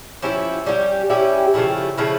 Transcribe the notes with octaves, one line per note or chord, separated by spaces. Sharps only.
F3 C#4 E4 G4
G3 C#4 E4 G4
G3 C#4 E4 G4
C#3 F3 A3 E4
C#3 F3 A3 E4